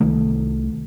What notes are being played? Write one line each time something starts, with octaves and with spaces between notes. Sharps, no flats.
C2 D#3 A3